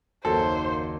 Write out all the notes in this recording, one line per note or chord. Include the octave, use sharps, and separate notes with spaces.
F#1 D#2 F#3 A#3 A4 C5 F#5